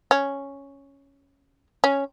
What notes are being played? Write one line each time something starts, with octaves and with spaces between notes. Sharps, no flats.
C#4
C#4